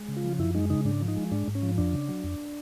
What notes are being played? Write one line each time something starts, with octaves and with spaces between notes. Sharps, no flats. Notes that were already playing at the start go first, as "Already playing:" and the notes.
Already playing: G#3
C#3
F4
F3
F#2 E4
G#3 D#4
C#3 D#4
G#2 D4
F3
D#4
G#3
G#2 D4
G#2
C#4
F3
F2 D4
C#3
F#3
F2